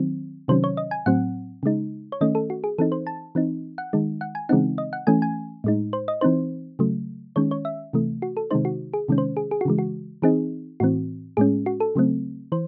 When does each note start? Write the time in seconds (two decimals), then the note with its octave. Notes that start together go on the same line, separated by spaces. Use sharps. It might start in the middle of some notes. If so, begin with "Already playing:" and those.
Already playing: D#3 F#3 C4
0.48 C3 D#3 F#3 C#4 C5
0.64 C#5
0.77 D#5
0.91 G#5
1.06 A2 F#3 C4 F#5
1.63 C#3 G#3 D#4
2.12 C#5
2.21 D#3 A3 C#4 D#5
2.35 A4
2.50 F#4
2.64 G#4
2.78 E3 C4 D#4 A4
2.92 C5
3.07 A5
3.35 E3 C4 D#4
3.78 F#5
3.93 D#3 G#3 D#4
4.21 F#5
4.35 G#5
4.49 C#3 E3 G#3 C4 D#4 F#5
4.78 D#5
4.93 F#5
5.07 E3 A3 C#4 G#5
5.22 G#5
5.64 A2 G#3 D#4
5.93 C5
6.08 D#5
6.21 E3 C4 D#4 C5
6.79 C#3 F#3 A3
7.36 D#3 G#3 C#4 C#5
7.51 C#5
7.65 E5
7.93 C3 E3 A3
8.22 F#4
8.37 A4
8.51 C3 D#3 G#3 D#4 C5
8.65 F#4
8.94 G#4
9.08 C3 D#3 G#3 C#4
9.18 C5
9.37 G#4
9.51 G#4
9.61 F#4
9.65 C#3 E3 G#3
9.78 F#4
10.22 E3 C4 D#4 G#4
10.80 A2 E3 C4 F#4
11.37 A2 G#3 C#4 G#4
11.66 F#4
11.80 A4
11.95 C#3 F#3 A3 C4
12.52 E3 C5